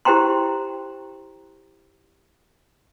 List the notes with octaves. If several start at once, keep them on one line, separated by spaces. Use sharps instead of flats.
E4 G4 C5 G5 A#5 C6